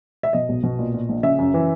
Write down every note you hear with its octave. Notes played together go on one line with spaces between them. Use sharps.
E5
B2 D#5
B1
B2
A#2
A#2
A#1
C#3 E5
F#2
E3